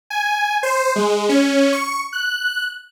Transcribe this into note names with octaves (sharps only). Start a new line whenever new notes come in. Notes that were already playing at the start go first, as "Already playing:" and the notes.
G#5
C5
G#3
C#4
C#6
F#6